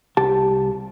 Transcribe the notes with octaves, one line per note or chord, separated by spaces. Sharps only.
C2 G4 A5